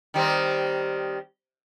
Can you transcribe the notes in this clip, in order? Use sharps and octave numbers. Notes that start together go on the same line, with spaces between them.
D#3 G3 C4